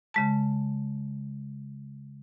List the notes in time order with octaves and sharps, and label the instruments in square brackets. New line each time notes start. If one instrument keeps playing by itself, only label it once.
[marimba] C#3 G#3 A5